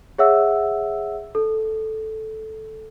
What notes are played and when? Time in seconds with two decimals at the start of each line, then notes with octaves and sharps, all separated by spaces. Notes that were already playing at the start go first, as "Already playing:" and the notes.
0.18 G#4 C#5 E5 F#5 E6
1.35 A4